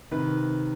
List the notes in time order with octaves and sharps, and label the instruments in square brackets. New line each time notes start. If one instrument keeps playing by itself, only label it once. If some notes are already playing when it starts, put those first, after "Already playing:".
[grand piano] C3 D#3 B4